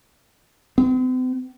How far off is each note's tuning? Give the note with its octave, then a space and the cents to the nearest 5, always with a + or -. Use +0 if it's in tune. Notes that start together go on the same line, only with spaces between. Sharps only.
C4 -45